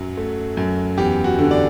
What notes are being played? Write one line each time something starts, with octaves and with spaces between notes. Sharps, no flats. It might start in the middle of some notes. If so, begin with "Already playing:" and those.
Already playing: F#2 F#3 F#4
A3
F#2
E2 G4
F#4
D3
D5